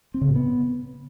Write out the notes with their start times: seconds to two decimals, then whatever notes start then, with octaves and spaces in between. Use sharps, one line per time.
0.14 C4
0.21 C#3
0.28 A2
0.36 B3